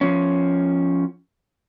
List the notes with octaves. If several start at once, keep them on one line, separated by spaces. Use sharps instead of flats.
F3 C#4